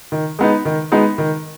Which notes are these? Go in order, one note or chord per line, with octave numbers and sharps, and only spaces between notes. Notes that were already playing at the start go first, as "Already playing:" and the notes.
D#3
G#3 B3 D#4
D#3
G#3 B3 D#4
D#3